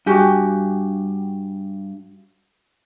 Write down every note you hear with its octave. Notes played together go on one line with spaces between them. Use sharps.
G2 F#4 G4 G#5